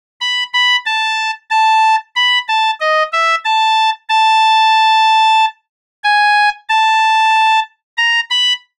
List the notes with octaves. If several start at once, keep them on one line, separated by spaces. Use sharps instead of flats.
B5
B5
A5
A5
B5
A5
D#5
E5
A5
A5
G#5
A5
A#5
B5